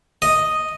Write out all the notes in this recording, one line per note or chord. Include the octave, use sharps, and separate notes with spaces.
D#5